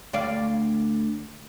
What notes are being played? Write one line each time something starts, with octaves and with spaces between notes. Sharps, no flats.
D2 D5 F5